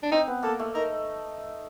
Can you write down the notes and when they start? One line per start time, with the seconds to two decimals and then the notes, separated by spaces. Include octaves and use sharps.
0.03 D4
0.12 C4 D#4
0.27 B3
0.43 A#3 A4
0.59 A3
0.74 D#4 A#4